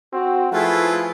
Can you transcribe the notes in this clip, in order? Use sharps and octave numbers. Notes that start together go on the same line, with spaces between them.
C4 F#4
F3 A3 E4 F4 G#4 B4